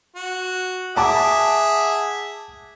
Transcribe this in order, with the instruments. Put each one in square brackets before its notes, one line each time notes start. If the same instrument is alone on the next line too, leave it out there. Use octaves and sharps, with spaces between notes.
[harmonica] F#4
[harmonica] G#4 E5 [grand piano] F#5 A5 D6